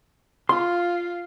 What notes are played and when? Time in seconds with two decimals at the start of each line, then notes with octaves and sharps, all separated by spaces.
0.49 F4 C6